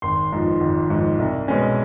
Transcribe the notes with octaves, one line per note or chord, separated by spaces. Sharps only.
G#1 C6
G#2 F3
G#1
G#2 F3
C2
B2 G#3 C#4